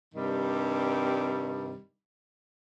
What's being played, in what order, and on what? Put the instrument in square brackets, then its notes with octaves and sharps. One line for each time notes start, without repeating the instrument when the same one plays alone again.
[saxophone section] G2 C3 D#3 G3